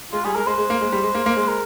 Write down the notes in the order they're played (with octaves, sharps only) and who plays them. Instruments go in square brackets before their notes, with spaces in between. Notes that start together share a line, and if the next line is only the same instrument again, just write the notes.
[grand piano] G#3 [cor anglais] F4
[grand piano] G3 [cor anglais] G#4
[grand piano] G#3 [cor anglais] A#4
[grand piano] G#3 [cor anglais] C5
[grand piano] G#3
A#3
G#3
G3
G#3
A#3
A#3
G#3
[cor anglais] A#4